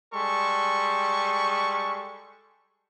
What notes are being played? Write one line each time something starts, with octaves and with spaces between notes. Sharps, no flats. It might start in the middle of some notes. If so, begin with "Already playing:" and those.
G3 G#3 A4 C#6